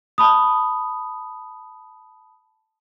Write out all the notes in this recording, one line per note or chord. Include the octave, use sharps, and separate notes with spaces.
A5 B5 D#6